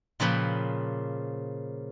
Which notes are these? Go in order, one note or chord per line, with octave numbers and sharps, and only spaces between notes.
A#2 C#3 F3 B4 G5